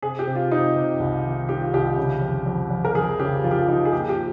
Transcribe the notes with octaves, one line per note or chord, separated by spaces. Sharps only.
C3 G#4
G4
C3
F4
C3 D#4
C3
C2
D#3
D#3 G4
F4
C2 G4
C#3
F2
F2
F2
A#4
F2 G#4
C#3 G4
F2 F4
G4
F4
F2 D#4
G#4
A#2 G4
G4